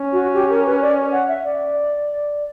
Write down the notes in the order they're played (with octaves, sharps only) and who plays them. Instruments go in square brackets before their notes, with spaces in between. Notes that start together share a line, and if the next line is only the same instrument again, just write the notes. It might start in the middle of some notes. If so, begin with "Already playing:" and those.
Already playing: [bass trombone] C#4
[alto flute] F#4
G4
A#4
B4
D5
F#5
E5
D5